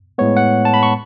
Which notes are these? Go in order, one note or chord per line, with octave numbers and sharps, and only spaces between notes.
A2 G#3 B3 C#5
F#5
A5
B5
C#6